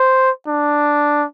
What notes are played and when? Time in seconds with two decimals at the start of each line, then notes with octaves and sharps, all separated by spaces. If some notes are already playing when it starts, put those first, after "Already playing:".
Already playing: C5
0.47 D4